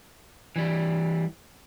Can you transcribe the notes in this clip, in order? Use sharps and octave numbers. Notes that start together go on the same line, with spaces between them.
E3 G3